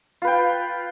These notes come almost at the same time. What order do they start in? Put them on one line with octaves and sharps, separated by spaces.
F4 B4 G5